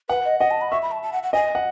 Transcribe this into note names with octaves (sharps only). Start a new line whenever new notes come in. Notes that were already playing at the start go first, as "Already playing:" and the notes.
B4 F#5
D#5
D#5 F#5
A5
B5
E5 C#6
B5
A5
A5
F#5
F#5
D#5 G#5
F#5